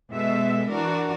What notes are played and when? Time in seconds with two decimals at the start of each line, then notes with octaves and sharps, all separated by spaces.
0.11 B2 G#3 A4 E5
0.71 E3 D4 F#4 A#4